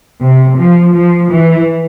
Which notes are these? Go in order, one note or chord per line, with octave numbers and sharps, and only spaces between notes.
C3
F3
F3
E3